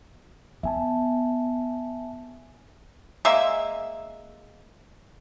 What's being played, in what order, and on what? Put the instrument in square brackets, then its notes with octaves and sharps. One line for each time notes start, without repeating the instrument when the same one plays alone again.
[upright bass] B3 [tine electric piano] E5 G#5 A5
[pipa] G#3 A#3 E5